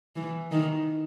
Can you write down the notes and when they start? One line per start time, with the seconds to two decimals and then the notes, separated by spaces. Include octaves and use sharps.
0.16 E3
0.52 D#3